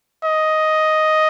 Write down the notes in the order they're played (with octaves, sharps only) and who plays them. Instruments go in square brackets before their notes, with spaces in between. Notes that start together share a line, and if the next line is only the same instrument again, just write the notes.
[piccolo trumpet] D#5